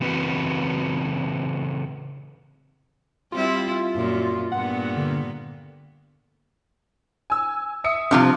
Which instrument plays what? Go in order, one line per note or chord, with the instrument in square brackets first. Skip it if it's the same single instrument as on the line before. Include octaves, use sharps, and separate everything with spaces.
[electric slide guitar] C#3 E3 C4 F#4 B4
[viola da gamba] G3 C4 E4 [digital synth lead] F4
[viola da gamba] F#2 A#2
[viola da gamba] G2 A#2 B3 [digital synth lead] F#5
[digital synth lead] D3
[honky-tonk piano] G#5 E6
E5 D#6 C#7
[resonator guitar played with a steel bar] G2 C3 F3 [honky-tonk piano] C4